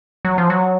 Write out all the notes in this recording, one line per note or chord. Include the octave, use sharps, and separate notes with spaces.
F#3
F3
F#3